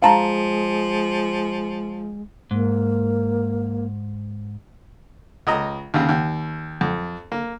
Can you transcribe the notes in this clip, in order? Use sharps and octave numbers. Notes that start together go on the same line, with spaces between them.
F3 G#3 F5 A5 A#5
G#2 A#3
C#2 D#5 A#5
D#2 C#3
D#2
F2
A#3